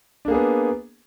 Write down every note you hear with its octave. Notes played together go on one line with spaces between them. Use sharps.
A#3 B3 D4 G#4